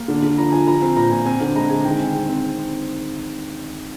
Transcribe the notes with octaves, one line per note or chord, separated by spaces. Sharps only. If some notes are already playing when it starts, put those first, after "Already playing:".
Already playing: A#3
D3
D3
F3 A#5
F3 G#5
F3 A#5
C4
A#2 A#5
A#2 G#5
C4 G#5
D3 G#5
G#3 A#5
G#3 G#5
D#3 G5
C4
G#3
C4